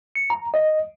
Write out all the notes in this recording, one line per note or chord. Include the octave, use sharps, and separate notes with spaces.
C#7
A#5
D#5